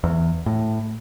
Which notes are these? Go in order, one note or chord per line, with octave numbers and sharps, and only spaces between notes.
E2
A2